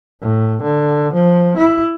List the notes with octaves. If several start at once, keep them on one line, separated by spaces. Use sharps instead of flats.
A2
D3
F3
E4